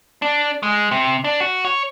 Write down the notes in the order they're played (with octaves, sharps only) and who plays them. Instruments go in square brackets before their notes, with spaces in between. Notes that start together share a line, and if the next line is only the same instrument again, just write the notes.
[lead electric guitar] D4
G#3
C3
D4
F#4
C#5